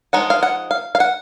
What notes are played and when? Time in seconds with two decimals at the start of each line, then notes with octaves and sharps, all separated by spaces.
0.13 F3 G#3 D#4 F#5
0.30 F5
0.43 F#5
0.71 F5
0.95 F5
1.00 F#5